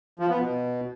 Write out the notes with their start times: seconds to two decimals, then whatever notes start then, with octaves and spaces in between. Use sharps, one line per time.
0.19 F3
0.30 B3
0.40 B2